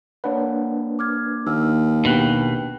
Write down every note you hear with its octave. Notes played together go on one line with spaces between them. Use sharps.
A#3 D4 B4 C#5 F#5
D6 F6 G#6
D#2 E6 F6
A#1 B2 D4 G4 G5 F#6